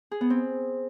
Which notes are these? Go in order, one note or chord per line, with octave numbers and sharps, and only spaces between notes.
G#4
B3
C4